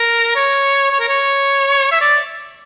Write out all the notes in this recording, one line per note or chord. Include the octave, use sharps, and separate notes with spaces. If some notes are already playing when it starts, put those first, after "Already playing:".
Already playing: A#4
C#5
C#5
A#4
C#5
E5
D5